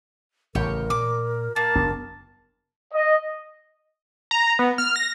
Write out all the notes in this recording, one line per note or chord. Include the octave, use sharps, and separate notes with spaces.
A1 C#3 G4 A#4 C#5
A#2 D6
A#3 A#4 A5
F#1 B3 D4
D#5
A#5
B3
F6
A#6